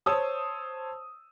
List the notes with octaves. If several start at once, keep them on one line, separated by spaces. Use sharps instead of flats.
C5 C#5 A5 D#6 E6